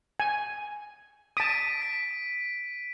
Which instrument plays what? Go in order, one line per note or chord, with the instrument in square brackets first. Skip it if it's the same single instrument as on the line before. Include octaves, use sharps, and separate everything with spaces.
[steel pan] G#5
[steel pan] A5 D#6 [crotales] B6 D7 D#7
[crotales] B6